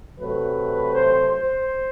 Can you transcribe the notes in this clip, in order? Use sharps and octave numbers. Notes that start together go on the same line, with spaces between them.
C3 F#3 A3 B4
C5
C5